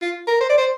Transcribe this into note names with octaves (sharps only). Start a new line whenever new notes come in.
F4
A#4
C5
D5
C5